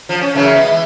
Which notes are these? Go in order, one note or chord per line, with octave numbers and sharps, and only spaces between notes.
F3
C#4
F#2 C#3 E3
G#3 B3
E3